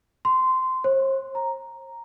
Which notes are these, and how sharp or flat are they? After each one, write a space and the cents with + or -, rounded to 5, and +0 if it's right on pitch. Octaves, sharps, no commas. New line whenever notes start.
C6 -15
C5 +45
A#5 +0